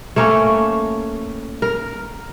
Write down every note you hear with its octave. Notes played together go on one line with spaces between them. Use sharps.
A3 A#3 C#4 A#4
A#4